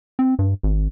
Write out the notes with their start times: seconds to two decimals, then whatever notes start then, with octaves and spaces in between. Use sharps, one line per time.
0.19 C4
0.39 G2
0.63 G#1